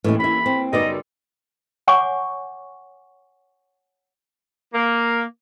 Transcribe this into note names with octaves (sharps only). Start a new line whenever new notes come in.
D#2 A2 E3 G#3 C#4
C#4 E4 B5
C4
F#2 C#3 G3 B3 D#4 D5 D#5
C#5 F#5 G#5 C#6 D6
A#3